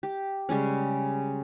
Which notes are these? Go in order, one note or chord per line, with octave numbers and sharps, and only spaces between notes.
G4
C#3 G3 G#3 C#4